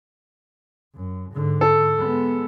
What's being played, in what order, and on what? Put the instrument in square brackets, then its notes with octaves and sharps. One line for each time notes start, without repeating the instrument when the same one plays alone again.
[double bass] F#2
G#2 D3
[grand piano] A4
[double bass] G#3 B3